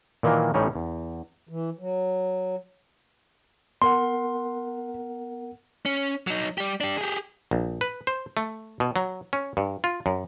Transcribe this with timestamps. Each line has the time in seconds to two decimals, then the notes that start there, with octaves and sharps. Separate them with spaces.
0.23 A#2 D#3 E3 F#3 A#3
0.54 A1 A2 G3 C#4 D#4
0.75 E2
1.49 E3
1.79 F#3
3.82 B3 A#4 F#5 C6
5.86 C#4
6.27 F#3 D#4
6.58 G3 G4
6.81 D4 G4
6.98 G4 G#4
7.51 A#1
7.81 B4
8.07 C5
8.37 A3
8.80 B2
8.96 F#3
9.33 C#4
9.57 G2
9.84 F4
10.06 F#2